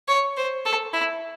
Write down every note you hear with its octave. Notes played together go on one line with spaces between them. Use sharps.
C#5
C5
A4
E4